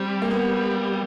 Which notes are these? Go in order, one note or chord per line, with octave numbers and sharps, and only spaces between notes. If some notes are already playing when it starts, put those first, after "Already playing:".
Already playing: G3 C4
A#3
B3